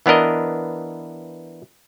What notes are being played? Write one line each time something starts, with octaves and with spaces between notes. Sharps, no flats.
E3 B3 D4 A#4 D#5